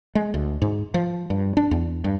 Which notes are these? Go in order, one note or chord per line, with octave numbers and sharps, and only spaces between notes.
G#3
D2
G#2
F3
G2
D4
E2
G2